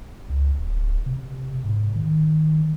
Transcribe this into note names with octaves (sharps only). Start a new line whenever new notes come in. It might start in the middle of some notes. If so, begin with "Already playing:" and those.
C#2
D1
C3
G#2
D#3